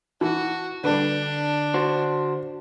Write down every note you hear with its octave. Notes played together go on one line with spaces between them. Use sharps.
E3 F#4 A5
D3 G3 D4 B4
F#4 C5